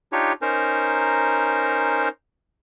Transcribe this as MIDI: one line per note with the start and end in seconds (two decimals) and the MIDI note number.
0.12 0.33 62
0.12 0.33 63
0.12 0.33 65
0.12 0.33 67
0.12 0.33 73
0.42 2.09 61
0.42 2.09 63
0.42 2.09 70
0.42 2.09 72